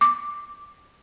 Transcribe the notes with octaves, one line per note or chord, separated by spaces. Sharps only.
D6